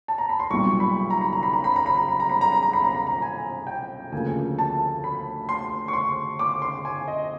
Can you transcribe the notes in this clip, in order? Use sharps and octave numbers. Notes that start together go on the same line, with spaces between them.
A5
A#5
B5
C6
B1 A#2 G3 C#6
B5
A#5
B5
A#5
B5
A#5
B5
A#5
B5
A#5
B5
A#5
B5
A#5
B5
A#5
B5
A#5
B5
A#5
G#5
G5
D2 C#3 F3 A#3 G#5
A5
B5
C6
C#6
C6
D6
C6
G#5
D#5